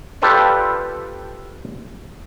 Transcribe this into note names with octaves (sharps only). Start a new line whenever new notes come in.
F4 G4 A4 B4 C5 D5